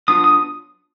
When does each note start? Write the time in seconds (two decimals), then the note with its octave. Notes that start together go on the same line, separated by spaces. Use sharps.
0.08 F#3 B3 D4 F4 D#6
0.24 D#6